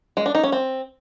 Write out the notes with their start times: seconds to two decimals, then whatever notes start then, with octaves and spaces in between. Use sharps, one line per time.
0.17 G#3
0.26 D4
0.35 D#4
0.43 C#4
0.52 C4